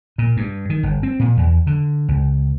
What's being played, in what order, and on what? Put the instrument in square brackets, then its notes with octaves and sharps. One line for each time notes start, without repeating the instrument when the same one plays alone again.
[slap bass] A#2
G2
D#3
G1
C4
A#2
E2
D3
C#2